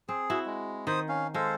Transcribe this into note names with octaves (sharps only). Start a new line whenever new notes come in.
C4 G#4
E4 F#4
G#3
D#3 C5 D#6
C#4 F5
G#3 A4 C5 F5